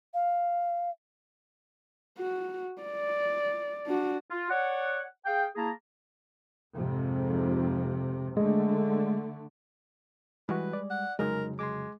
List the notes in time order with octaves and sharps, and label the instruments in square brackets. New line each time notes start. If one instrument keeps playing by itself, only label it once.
[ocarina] F5
[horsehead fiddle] F#4
D5
D4 F#4
[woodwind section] F4
C#5 D5 F#5
G#4 F5 G5
A#3 E4 G#4 A5 A#5
[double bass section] F2 G#2 C3
[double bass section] D3 A3 [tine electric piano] G#3
[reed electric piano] E3 F#4 [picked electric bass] G3 G#3 [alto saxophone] B4
[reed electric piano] D5
[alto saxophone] F#5
[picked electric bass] F1 C#3 F#3 [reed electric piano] G#3 D#4 [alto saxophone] A#4
[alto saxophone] G#3 [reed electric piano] C6 D6